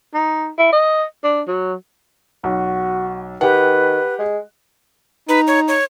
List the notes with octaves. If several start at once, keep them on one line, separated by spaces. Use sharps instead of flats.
D#4
E4
D#5
D4
F#3
B1 F#4
D#3 G4 B4 F#5
G#3
D#4 B4
C#5
C#5